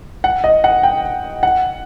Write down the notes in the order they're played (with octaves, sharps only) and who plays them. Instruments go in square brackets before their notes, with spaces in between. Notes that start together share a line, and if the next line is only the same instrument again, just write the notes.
[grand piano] F#5
D#5
F#5
G5
F#5